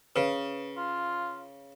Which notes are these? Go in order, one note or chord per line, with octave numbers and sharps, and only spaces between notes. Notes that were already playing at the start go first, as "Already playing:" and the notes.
C#3 B4
F4